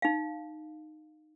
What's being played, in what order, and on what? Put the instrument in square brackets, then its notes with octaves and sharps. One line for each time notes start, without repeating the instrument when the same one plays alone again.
[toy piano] D#4 F5